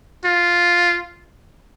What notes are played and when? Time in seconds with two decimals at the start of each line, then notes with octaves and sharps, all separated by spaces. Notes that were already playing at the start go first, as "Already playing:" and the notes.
0.24 F4